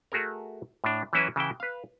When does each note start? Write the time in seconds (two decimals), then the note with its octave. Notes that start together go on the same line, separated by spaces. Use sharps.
0.12 A3 F#4 G#4 A#4
0.84 A2 D4
1.13 E3 F#3 C#4 E4 F#4 B4
1.36 C#3 E3 E4 G5
1.60 B4 F5